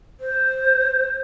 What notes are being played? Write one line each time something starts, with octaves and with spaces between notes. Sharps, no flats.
C5